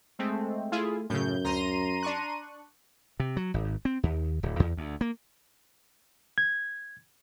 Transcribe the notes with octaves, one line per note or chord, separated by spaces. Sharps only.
G#3 A3 C4
A3 E4 F4 G#4
F#2 A2 C#3 G6
D2 A#5 C6 D#7
D4 C#6 F#6
C3
F#3
G#1
C4
D#2
D1
E2
D2
A#3
G#6